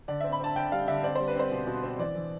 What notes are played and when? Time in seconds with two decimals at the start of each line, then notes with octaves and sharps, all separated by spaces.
0.08 D3 D5
0.21 C4 E5
0.32 B5
0.40 C4 A5
0.56 D3 G5
0.72 G3 F5
0.88 D3 E5
1.04 C4 D5
1.15 G3 C5
1.28 B4
1.36 C4 C5
1.51 B2
1.67 B2
1.83 C4
1.99 E3 D5
2.15 E3